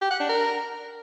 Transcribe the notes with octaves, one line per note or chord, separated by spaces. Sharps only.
G4
F#5
D4
A#4